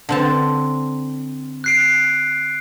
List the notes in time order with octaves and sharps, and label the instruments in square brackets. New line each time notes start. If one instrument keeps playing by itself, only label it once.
[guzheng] D3 C4 A5
[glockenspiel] F#6 C7 D7